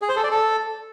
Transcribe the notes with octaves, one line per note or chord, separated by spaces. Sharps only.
G#4
C5
A4
D5
A4